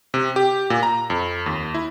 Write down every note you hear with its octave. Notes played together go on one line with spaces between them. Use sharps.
C3
G4
A#2
A#5
F2
D#2
E4